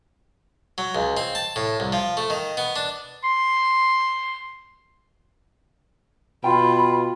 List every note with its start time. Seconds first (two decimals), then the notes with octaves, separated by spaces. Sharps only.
0.78 F#3
0.95 C#2
1.17 C4
1.35 A5
1.56 A2
1.80 C2
1.92 F3
2.17 A3
2.30 D#3
2.57 B3
2.76 D4
3.23 C6
6.44 B2 F4 G5 B5